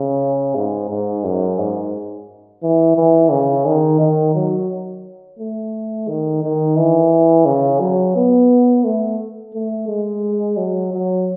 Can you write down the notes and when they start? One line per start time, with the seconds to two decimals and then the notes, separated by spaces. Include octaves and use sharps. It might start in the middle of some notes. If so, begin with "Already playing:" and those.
Already playing: C#3
0.55 G#2
0.89 G#2
1.24 F#2
1.59 G#2
2.63 E3
2.97 E3
3.31 C#3
3.66 D#3
4.00 D#3
4.35 F#3
5.39 A3
6.08 D#3
6.43 D#3
6.78 E3
7.46 C#3
7.80 F#3
8.16 B3
8.84 A3
9.54 A3
9.88 G#3
10.57 F#3
10.92 F#3